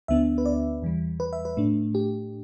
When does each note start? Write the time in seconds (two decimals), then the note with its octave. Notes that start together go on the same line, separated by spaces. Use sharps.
0.08 D2 D3 B3 D4 E5
0.38 B4
0.46 D5
0.82 E2 E3 G3
1.20 B4
1.33 E5
1.45 B4
1.57 A2 A3 D4
1.95 G4